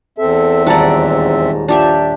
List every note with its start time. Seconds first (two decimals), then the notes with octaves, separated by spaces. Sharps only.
0.18 E2 C4 A4 E5
0.67 D#1 G#2 D5 F#5 A5 A#5
1.68 F3 D4 G4 E5